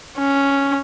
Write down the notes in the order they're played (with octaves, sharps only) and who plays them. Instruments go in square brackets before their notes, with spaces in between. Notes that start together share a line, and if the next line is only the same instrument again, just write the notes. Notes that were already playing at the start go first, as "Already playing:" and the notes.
[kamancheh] C#4